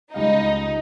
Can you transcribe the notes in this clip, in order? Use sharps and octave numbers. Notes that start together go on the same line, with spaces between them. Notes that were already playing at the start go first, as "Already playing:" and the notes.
C#2 G3 D#4 F5